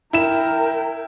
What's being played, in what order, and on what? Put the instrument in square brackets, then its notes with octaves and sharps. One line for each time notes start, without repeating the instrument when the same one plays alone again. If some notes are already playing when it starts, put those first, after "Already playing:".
[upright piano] E4 E7 [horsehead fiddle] A#4 G5